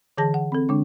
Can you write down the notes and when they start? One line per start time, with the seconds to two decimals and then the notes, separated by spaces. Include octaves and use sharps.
0.18 D3 E3 G#4 A5 A#6
0.34 F#5
0.52 C4 A4
0.69 D3 G#3 D4